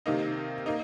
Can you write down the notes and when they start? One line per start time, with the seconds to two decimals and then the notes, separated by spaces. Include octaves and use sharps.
0.06 C3 D#3 A#3 D#4
0.66 A#3 D#4